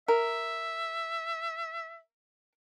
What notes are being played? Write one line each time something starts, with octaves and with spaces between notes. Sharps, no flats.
A#4 E5